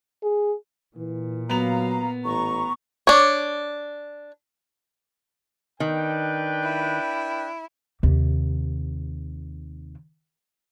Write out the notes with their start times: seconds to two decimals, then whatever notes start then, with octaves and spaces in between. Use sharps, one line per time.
0.23 G#4
0.96 A#2 E3
1.49 F#3 B3 F5 A#5 F7
2.25 A1 A#5 C#6
3.07 D4 C#5
5.80 D#3 D4 B4 G5
6.63 E4
8.03 D#2 C3